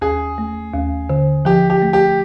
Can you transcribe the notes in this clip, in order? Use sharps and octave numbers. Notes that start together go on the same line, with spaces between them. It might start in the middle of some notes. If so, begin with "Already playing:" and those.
D#2 G#4
A3
D#2
D3
F3 G4
G4
A3
G4